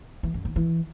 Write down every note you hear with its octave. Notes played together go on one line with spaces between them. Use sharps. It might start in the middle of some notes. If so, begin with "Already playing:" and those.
E3
F#2
D#3
E3